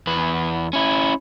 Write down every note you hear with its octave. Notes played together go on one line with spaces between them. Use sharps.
E2 B4
C#4 E4